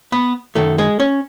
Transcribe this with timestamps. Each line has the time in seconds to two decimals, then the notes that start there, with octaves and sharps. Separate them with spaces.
0.12 B3 B4
0.55 F#2 D#3 F#3 A3 A4
0.78 G#3 G#4
1.00 C#4 C#5